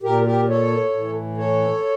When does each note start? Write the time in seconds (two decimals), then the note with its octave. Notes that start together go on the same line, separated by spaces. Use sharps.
0.03 A#2 G4 A#4
0.26 G4 A#4
0.48 A4 C#5
0.93 A2 E3
1.37 A4 C#5